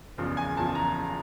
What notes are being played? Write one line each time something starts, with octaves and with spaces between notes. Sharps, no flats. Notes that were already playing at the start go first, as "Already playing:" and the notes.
F#1 E2 C#3 F3
G#5
F#1 E2 C#3 F3 A5
A#5